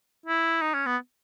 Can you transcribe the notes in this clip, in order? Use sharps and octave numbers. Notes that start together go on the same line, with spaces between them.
E4
D#4
C#4
B3